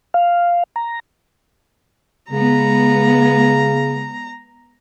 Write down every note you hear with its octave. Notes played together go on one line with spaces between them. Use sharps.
F5
A#5
C#3 G#3 B3 A#5